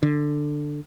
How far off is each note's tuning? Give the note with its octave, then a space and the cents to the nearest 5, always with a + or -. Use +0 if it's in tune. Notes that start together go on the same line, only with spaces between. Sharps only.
D3 +10